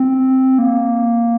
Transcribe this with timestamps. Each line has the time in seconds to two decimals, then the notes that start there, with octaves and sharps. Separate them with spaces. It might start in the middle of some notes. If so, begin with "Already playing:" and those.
Already playing: C4
0.59 A#3